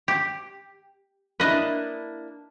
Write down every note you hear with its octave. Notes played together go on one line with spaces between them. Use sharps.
G4
A#3 D4 E4 B4 D#5